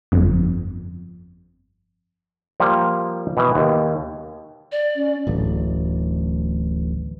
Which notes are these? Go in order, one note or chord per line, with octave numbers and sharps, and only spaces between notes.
G1 F2
F3 G3 A#3
B2 E3
D#2
D5
C#4
D1 A1